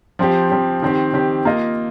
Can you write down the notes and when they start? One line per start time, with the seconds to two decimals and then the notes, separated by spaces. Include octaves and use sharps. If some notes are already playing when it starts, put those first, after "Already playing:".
0.19 F3 C4 G4
0.50 F3 C4 G4
0.82 D#3 C4 G4
1.13 D#3 C4 G4
1.45 A#3 F4 D#5